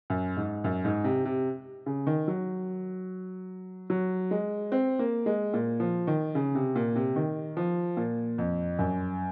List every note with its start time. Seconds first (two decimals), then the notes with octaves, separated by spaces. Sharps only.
0.10 F#2
0.37 G#2
0.64 F#2
0.85 G#2
1.04 C3
1.25 C3
1.86 C#3
2.07 D#3
2.28 F#3
3.90 F#3
4.31 G#3
4.72 C4
4.99 A#3
5.26 G#3
5.54 A#2
5.80 F3
6.07 D#3
6.35 C#3
6.55 C3
6.75 A#2
6.96 C3
7.16 D#3
7.57 F3
7.97 A#2
8.38 F2
8.79 F#2